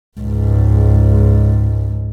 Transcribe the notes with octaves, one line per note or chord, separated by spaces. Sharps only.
C#2 G#2